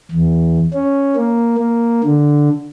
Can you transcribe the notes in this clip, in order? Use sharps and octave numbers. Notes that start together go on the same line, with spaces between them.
E2
C#4
A#3
A#3
D3